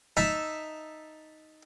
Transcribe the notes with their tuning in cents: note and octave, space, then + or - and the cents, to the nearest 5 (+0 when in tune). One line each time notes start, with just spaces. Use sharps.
D#4 +0 E5 +0 A5 +0